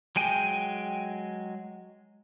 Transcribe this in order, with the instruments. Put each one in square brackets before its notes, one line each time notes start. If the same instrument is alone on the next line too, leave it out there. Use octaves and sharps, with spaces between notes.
[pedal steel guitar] F#3 G#3 G5 G#5